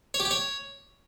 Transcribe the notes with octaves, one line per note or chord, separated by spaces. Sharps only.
C#5
G4
G5
C#5